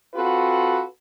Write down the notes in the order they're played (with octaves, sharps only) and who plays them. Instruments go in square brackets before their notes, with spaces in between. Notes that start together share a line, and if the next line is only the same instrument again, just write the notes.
[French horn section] C4 F4 F#4 A4 B4